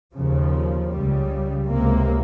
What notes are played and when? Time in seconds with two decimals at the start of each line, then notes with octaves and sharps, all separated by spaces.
0.14 D#2 C#3 F3
0.91 C#2 C#3 G3
1.68 C#2 C3 A#3